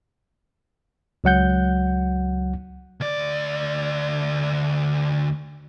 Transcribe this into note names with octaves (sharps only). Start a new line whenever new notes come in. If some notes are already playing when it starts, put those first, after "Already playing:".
C#2 F#3 F#5 G6
D2 D5